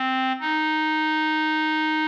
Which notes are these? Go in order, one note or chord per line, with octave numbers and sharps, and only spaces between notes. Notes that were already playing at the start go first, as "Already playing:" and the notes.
Already playing: C4
D#4